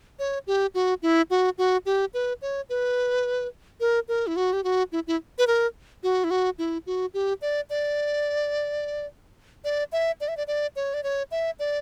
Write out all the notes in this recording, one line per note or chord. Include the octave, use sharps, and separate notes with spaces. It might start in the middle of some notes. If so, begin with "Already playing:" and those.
C#5
G4
F#4
E4
F#4
F#4
G4
B4
C#5
B4
A#4
A#4
E4
F#4
G4
F#4
E4
E4
B4
A#4
F#4
E4
F#4
E4
F#4
G4
D5
D5
D5
E5
D5
E5
D5
D5
C#5
D5
C#5
E5
D5